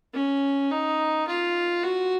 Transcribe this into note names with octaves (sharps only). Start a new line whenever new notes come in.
C#4
D#4
F4
F#4